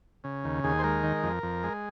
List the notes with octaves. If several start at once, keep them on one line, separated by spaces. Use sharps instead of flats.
C#3
D#2
D#2 G#4
C5
G#3 A#4
D#3
F2
F2
G#3